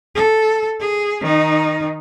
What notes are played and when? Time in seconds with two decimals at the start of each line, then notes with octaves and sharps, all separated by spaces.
0.15 A4
0.80 G#4
1.21 D#3 D#4